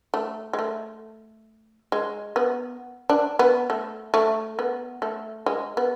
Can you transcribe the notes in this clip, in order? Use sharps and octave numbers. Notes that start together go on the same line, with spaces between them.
A3
G#3
A3
G#3
B3
D4
B3
A3
A3
B3
A3
G#3
B3